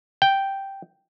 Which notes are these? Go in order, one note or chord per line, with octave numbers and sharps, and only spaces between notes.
G5